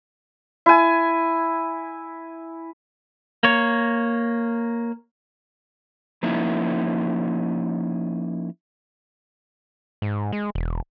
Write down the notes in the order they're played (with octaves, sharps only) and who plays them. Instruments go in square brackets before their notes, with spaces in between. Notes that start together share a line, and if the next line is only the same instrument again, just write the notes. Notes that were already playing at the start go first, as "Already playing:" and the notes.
[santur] E4 G#5
[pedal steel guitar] A#3 C#5
[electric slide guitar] F3 A#3 C#4 D#4 E4
[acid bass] G#2
G#3
E1